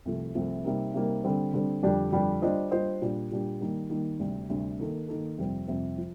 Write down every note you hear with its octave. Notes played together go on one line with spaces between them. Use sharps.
C2 C3 F3 A3
C2 C3 F3 A3
C3 G3 A#3 D#4 A#4
C3 G3 A#3 D#4 A#4
D3 G3 C4
D3 G3 C4
F2 D3 G3 D4 G4
F2 D3 G3 D4 G4
G3 D4 F4 C5 D#5
G3 D4 F4 C5 D#5
A#2 G3 D4 G4
A#2 G3 D4 G4
D#3 G3 A#3 D#4
D#3 G3 A#3 D#4
D2 C3 G3 D4
D2 C3 G3 D4
D#3 A#3 D#4 A4
D#3 A#3 D#4 A4
F2 C3 G3 C4
F2 C3 G3 C4
F3